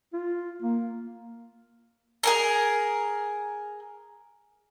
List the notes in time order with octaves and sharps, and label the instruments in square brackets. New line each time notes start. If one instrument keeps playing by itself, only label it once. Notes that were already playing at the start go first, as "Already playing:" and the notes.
[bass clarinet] F4
A#3
[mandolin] G#4 A#4 A#5